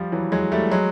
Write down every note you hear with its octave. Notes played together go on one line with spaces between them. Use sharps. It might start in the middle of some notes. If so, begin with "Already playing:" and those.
Already playing: F3 G3
E3 F#3
F#3 G#3
G3 A3
F#3 G#3